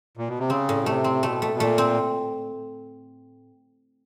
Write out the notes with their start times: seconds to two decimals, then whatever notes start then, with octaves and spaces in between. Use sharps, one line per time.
0.17 A#2
0.28 B2
0.39 C3
0.50 C#3 C4
0.69 A2
0.82 B2
0.86 C3 A3
1.04 C4
1.23 B2 A3
1.42 A3
1.54 B2
1.60 A#2 A3
1.78 C4